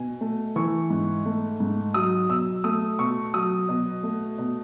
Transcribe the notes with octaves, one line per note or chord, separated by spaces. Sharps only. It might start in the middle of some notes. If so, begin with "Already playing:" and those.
Already playing: B2 G#5
A3
E3 C#6
G#2
A3
G#2
F#3 D#6
B2 E6
A3 D#6
B2 C#6
F#3 D#6
B2
A3
B2